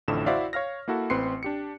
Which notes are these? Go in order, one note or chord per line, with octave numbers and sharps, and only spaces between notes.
A1 F2 A2 D3 E7
E4 F#4 C5 D5 E5 F5
C#5 F5 F6 A#6
A#3 E4 F#4 A4
A1 C4 B4 C6 C7 C#7
D4 G4 C#7